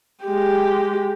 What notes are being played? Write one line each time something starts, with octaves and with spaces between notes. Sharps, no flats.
G#3 G4